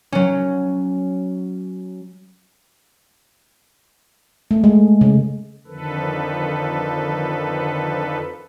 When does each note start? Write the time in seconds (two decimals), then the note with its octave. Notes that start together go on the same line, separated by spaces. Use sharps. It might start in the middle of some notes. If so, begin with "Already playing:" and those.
0.12 F#3 C#4
4.51 A3
4.64 G#3
5.01 C#3
5.67 F2 D3 D#3 F3 A4 B4